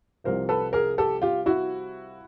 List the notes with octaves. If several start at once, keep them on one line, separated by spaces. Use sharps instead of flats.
C2 C3 F3 A#4 C5
A4 B4
G#4 A#4
G4 A4
F4 G4
E4 F#4